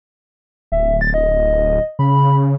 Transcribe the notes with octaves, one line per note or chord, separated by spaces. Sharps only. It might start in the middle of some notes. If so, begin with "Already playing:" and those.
D1 E5
A6
D#5
C#3 B5